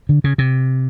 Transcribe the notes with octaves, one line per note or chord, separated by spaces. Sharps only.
D3
C#3
C3